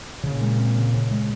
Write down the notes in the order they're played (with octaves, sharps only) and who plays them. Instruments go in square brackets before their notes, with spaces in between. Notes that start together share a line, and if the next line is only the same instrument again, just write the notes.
[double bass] A#2 [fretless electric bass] C#3
[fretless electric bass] G#3
C4
C#3
C#3
G#3